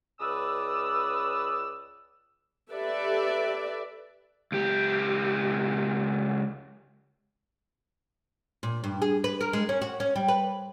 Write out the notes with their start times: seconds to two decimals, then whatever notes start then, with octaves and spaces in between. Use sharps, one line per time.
0.20 C#2 C#4 B4 D5 D#6 E6
2.72 G4 A4 B4 D5 E5
4.52 C#2 G4
8.63 A#2
8.84 G2
9.02 G#4
9.24 B4
9.41 A#4
9.53 G#3
9.69 C#4
9.82 F#4
10.00 C#4
10.16 G3
10.28 B4